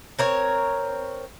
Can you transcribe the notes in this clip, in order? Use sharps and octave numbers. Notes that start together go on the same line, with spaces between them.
C4 A#4 C#5